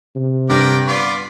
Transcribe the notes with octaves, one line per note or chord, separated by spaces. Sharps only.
C3
G2 D3 G3 A#4 D5 G5
B3 F4 D5